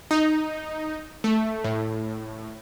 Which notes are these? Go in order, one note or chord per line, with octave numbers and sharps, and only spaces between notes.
D#4
A3
A2